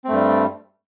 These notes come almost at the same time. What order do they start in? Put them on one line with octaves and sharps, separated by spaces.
C4 A3 G2 G3